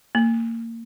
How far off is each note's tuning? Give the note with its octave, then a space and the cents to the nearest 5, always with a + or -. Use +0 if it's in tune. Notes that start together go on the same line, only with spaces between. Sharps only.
A#3 -25